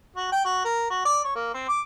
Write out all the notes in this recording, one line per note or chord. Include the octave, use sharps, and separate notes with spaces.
F#4
G5
F#4
A#4
F#4
D5
C#5
A#3
C4
D6